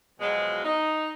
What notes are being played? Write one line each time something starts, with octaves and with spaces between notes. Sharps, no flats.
B2 F3 F#3 G#3
D#4